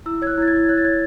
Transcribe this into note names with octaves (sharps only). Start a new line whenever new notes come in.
E4 E6
C#5 G#6
F#6
E4 A6
G#6
E4
C#5 F#6
A6
C#5 G#6